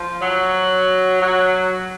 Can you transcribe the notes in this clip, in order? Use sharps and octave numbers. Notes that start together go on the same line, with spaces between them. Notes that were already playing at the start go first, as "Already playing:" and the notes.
Already playing: F3
F#3
F#3